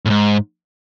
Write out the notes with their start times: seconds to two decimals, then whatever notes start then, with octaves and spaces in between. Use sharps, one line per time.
0.05 A2
0.10 G#2